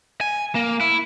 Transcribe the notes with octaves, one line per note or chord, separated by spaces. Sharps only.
G#5
A#3
E4